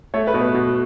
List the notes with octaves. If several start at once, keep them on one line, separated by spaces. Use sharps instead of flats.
A3 C#5
B4
B2
B4
B2